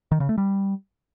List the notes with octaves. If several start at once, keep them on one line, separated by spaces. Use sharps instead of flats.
D#3
C#3
A3
G3